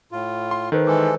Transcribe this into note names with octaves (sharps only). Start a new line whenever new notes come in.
A2 F4
C6
D#3 A4 B4 C5
E3 G#3 A4 D6